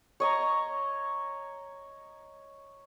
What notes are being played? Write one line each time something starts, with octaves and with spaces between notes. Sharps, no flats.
C#5 D#5 A#5